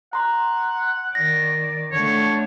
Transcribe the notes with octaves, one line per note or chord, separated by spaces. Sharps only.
F#5 A#5 C6
D#3 D5 A#6
D3 A3 C#5